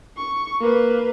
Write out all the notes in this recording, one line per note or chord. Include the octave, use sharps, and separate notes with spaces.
C#6
A#3 B4